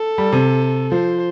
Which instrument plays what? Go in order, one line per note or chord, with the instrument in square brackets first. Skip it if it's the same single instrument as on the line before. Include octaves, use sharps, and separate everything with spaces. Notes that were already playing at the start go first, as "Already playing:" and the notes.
Already playing: [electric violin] A4
[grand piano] G3
C3
[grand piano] F3 [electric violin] C5